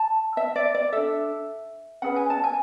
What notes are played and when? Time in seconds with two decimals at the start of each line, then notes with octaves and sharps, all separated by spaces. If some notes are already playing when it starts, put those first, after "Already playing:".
Already playing: A5
0.37 E5
0.56 D5
0.74 D5
0.92 D4 A4 E5
2.02 C#4 G#4 B4 F#5
2.16 G#5
2.30 A5
2.44 G#5